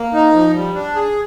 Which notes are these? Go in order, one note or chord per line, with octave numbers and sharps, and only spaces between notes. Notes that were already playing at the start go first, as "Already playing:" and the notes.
Already playing: A#3
D#4
F3
G3
D4
G#4